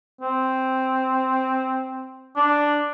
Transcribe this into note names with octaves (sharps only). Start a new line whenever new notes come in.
C4
D4